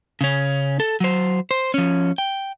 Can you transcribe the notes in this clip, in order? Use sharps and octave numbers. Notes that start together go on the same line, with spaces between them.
C#3 C#4
A4
F#3 C5
C5
F3 C#4
G5